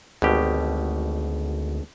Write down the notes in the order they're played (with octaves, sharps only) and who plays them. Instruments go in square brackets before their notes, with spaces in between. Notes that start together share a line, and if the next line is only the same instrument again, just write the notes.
[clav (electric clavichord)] G#1 B2 G4 [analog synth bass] D2